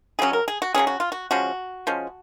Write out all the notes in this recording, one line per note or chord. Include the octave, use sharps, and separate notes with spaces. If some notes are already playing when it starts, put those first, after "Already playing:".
C#3 F#3 C#4 G#4
A#4
G#4
F#4
C#3 F#3 C#4 G#4
F#4
F4
F#4
F3 G#3 C#4 F#4
F3 G#3 C#4